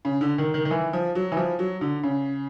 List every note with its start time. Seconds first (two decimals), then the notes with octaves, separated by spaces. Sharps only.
0.05 C#3
0.21 D3
0.38 D#3
0.54 D#3
0.65 D#3
0.71 E3
0.93 F3
1.15 F#3
1.32 E3
1.37 F3
1.59 F#3
1.81 D3
2.03 C#3